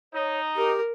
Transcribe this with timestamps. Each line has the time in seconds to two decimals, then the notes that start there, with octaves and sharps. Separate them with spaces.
0.14 D#4 C#5
0.56 G4 A#4